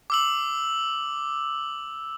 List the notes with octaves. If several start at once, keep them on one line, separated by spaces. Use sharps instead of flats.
D6 E6 F#7